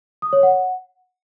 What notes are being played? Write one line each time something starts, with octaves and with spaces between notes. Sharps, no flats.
D#6
C#5
F#5